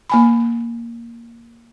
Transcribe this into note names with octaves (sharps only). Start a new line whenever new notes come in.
A#3 G#5 B5